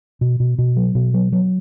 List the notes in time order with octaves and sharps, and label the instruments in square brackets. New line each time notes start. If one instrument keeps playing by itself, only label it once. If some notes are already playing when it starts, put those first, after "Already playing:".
[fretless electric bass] B2
B2
B2
F#3
B2
F#3
F#3